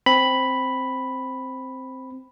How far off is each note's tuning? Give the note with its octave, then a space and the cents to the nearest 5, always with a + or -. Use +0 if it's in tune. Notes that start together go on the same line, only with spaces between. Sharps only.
C4 +0 B5 +0